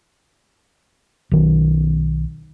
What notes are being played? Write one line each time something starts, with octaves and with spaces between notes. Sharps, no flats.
B1 D#3